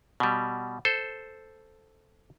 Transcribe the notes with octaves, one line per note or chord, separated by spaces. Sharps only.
B2 G3
A4 C5